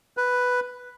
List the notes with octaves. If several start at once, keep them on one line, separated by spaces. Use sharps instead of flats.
B4